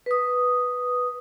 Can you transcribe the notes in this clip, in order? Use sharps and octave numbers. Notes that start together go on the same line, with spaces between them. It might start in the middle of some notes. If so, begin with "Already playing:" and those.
B4 D#6